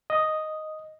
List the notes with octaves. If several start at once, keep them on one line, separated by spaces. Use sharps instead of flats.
D#5